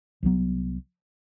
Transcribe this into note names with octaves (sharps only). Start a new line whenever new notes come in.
C2 B2 F#3 B3